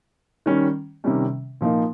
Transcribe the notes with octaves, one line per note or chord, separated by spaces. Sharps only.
D#3 G3 C#4
C3 D#3 G3 C#4
A#2 F3 A#3 D#4